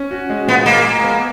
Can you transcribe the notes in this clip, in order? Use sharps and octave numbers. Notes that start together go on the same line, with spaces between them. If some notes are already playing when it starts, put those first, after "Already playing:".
Already playing: C#4
F#4
G#3
A#2 B3
G#3 A#3
G#3
B3